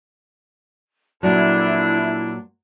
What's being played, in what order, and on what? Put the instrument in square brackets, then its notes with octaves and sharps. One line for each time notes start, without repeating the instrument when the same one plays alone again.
[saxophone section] F2 D4 [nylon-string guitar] A#2 F#3 [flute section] E4